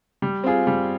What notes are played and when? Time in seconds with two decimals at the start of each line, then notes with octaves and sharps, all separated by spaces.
0.22 G3
0.44 C4 F4 G#4
0.67 G3